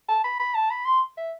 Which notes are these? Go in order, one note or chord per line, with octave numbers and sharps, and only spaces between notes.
A5
B5
B5
A5
B5
C6
E5